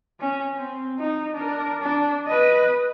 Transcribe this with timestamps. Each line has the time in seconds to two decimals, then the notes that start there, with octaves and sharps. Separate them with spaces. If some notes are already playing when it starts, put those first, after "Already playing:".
0.20 C#4
0.56 C4
0.98 D#4
1.34 D4 A#4
1.82 D4
2.27 B4 D#5